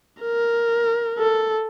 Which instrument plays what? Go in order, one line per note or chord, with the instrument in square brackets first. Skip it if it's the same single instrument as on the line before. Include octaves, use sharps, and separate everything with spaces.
[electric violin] A#4
A4